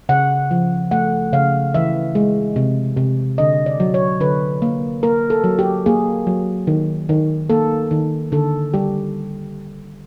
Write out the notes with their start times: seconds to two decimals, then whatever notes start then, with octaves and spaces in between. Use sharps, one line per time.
0.09 C#3 F#5
0.51 F3
0.91 A3 F#5
1.33 C#3 F5
1.74 E3 E5
2.15 G#3
2.56 C3
2.97 C3
3.38 D3 D#5
3.66 D5
3.80 F#3
3.94 C#5
4.20 D3 B4
4.62 A#3
5.03 A#3 A#4
5.30 A4
5.44 F#3
5.59 G4
5.86 A#3 G#4
6.27 F#3
6.67 D#3
7.09 D#3
7.49 A#3 A4
7.91 D#3
8.32 D3 A4
8.74 G3 G4